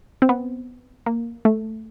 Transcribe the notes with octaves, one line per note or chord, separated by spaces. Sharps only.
C4
B3
A#3
A3